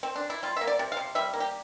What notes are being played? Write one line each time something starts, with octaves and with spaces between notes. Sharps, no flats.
C4
D4
E4
G3 F4
A#3 E5
D5
C3
F5
C3
G3 E5
A#3
G4